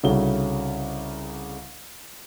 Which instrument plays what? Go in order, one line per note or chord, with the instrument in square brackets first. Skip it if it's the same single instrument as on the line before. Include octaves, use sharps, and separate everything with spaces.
[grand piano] C2 C#3 D#4 F#4 A4 G7